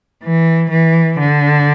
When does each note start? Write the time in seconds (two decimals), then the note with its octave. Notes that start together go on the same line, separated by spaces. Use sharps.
0.24 E3
0.70 E3
1.19 D3